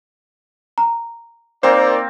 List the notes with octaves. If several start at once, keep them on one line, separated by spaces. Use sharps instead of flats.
A#5
A#3 C4 D#4 A#4 C5 D5